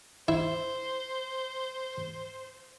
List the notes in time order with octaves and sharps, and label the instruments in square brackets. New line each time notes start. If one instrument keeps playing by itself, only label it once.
[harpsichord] E4 [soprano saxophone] C5